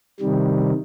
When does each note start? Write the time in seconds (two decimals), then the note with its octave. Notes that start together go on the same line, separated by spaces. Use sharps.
0.20 C3 D#3 G3